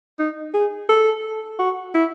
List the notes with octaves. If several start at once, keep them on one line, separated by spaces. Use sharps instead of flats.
D#4
G#4
A4
F#4
E4